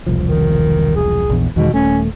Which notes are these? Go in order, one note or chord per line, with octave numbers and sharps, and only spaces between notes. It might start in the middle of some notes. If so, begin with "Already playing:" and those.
E1 C2 F3
D#3
G#4
A#1 E2
E2 B2 D#3 G#3
D#1 A3 C#4